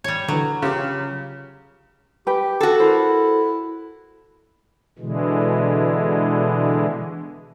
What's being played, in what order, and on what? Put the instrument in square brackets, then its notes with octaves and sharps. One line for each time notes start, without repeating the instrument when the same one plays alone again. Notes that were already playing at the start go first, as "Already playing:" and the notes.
[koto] G3 C#5
[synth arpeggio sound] D3 E3 [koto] F#3
[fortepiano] C#3 [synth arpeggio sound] F4 G4
[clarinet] G4 [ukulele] B4 G5
[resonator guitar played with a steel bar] F#4 A4
[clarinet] E4 [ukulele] A#4 C5
[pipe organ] B2 D3 E3 G#3